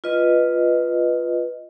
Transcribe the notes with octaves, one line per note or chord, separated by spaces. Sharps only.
F4 B4 D#5